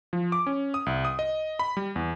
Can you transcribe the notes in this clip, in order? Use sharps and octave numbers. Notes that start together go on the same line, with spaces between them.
F3
D6
C#4
D#6
C2
D#6
D#5
B5
G3
E2